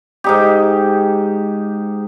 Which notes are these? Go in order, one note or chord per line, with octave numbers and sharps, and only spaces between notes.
G#2 D#4 G4